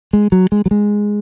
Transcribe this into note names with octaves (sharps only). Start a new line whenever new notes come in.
G#3
F#3
G#3
F#3
G#3